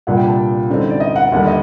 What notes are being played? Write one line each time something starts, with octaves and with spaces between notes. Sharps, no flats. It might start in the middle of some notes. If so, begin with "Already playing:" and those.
C2 A#2 G3 D4 F#5
G5
A5
F#2 D3 G3 C4 D#4
D5
D#5
F#5
D#2 D3 G3 F#5
D#5